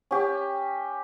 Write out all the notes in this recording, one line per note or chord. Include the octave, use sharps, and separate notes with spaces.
C#4 G4